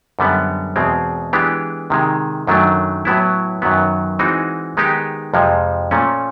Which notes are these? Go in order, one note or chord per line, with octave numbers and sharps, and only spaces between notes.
F#2 D3 G3 B3
E2 B2 G#3 C4
E3 G#3 B3 D4 G4
C3 D#3 G#3
F#2 D#3 F#3 A3 D4
A2 F#3 B3 E4
F#2 D#3 F#3 B3
E3 G#3 C4 D#4 F#4
D#3 G#3 B3 D#4 G4
F2 C3 F3 G#3
A#2 F3 A3 C#4